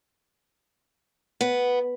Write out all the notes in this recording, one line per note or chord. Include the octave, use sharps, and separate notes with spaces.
B3